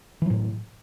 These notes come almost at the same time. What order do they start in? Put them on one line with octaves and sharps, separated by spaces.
E3 F#3 A2